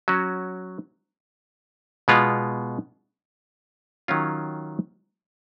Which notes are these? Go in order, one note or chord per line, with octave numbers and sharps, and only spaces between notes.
F#3 C#4 F#4
B2 G#3 B3 F4
D#3 F#3 C#4 F4